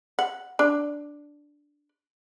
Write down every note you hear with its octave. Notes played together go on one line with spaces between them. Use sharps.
F#5
D4